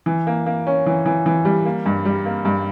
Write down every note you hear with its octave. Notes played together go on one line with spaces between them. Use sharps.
E3
A#3
A#3
C#4
E3
E3
E3
G3
A#3
G2
G3
A#3
G2